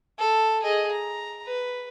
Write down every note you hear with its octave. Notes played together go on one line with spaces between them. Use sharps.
A4
G#4 D#5
A#5
B4